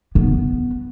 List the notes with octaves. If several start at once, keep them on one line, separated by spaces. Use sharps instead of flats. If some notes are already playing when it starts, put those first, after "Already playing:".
B3